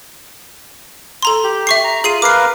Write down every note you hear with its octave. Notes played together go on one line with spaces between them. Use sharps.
A4 A#5 C6
G4
E5 C#6 C7
A#5
F4 G#4 C7 D#7
A#4 B4 F5 D6 C7